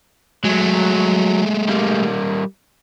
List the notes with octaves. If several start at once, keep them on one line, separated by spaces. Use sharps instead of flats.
F#3 G#3 A3
G3 A#3